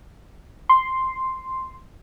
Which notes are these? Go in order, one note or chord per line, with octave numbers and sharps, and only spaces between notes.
C6